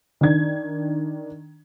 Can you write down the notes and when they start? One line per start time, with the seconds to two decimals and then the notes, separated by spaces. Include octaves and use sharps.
0.21 D#3 D4 G#6